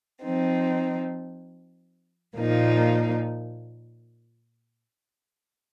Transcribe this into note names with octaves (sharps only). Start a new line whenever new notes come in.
F3 C4 D#4
A#2 F3 A#3 D#4